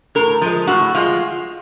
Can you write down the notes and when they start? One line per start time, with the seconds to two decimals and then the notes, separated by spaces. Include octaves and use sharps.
0.15 A2 A#4
0.42 F3 G#3
0.67 A2 F#4
0.95 F3 G#3 F4